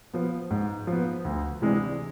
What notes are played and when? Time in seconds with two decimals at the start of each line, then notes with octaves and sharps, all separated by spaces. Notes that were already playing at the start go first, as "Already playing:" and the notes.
0.13 F3 B3
0.51 G#2
0.87 F3
0.92 B3
1.25 D2
1.62 C3 E3 G#3 D4